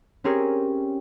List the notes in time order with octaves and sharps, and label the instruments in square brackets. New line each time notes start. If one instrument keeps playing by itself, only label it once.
[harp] C4 C#4 G4 G#4 A#4 C#5